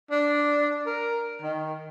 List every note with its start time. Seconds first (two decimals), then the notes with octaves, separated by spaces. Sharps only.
0.11 D4
0.86 A#4
1.42 D#3